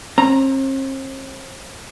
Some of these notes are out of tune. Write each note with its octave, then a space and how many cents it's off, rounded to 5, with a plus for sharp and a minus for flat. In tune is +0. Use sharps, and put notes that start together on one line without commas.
C4 +45 A#5 -5